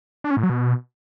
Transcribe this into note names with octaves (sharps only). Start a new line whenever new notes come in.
D4
C#4
A2
F#3
B2